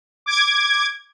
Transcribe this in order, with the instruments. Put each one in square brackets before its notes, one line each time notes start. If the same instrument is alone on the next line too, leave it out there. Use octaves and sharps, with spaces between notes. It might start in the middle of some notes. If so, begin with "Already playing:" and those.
[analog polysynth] D6 G#6